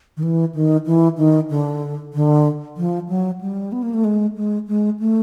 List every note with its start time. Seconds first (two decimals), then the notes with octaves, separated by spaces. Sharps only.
0.17 D#3
0.23 E3
0.55 D#3
0.86 E3
1.18 D#3
1.50 D3
2.14 D3
2.77 F3
3.09 F#3
3.41 G3
3.72 B3
3.83 A#3
3.94 A3
4.04 G#3
4.36 G#3
4.68 G#3
5.00 A3